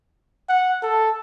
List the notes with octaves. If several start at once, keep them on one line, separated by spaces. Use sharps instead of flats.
F#5
A4